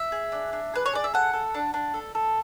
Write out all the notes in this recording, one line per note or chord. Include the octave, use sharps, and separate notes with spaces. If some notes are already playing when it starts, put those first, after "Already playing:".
Already playing: E5
G#4
D4
D4
G#4 B4
C#5
G#4 D5
E5
A4 F#5
A4
D4
D4
A4
A4